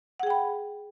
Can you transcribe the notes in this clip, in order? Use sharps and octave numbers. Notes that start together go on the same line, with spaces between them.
G#4 F#5 G5 B5